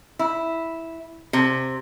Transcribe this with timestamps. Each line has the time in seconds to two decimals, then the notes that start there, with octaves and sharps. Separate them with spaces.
0.19 E4
1.33 C3